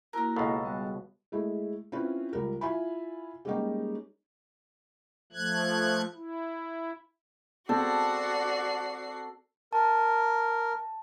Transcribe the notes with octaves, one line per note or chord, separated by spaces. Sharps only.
A#3 E4 F#4 A#4 A#5
C#2 B2 A4 F5
G3 B3 F#4
G#3 A3 E4
C4 C#4 E4 F4 B4
C#2 G3 A#4
E4 F4 E5 G#5 B5
G3 G#3 A#3 C#4 D#4 G4
F3 A3 F#6 G#6
E4
C4 F#4 A4 D5 C7
A#4 A5